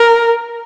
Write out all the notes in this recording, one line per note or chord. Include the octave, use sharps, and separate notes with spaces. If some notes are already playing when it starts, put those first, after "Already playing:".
Already playing: A#4